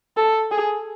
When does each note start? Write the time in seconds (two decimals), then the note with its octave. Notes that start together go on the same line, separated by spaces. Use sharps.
0.17 A4
0.51 G#4